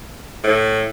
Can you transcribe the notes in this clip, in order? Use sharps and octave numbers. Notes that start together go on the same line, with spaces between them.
A2